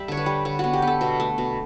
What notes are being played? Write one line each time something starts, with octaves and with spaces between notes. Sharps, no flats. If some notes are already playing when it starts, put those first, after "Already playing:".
Already playing: G3 E5
D3 C#5
B4
G3
D3 C#5
B3 F#4
G4
B3
A4
B2
A3
B2